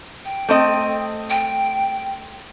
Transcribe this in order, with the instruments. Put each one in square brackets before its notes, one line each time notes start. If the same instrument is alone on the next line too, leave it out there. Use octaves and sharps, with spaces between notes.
[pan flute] G5
[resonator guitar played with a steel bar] A3 C4 D#5
[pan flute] G5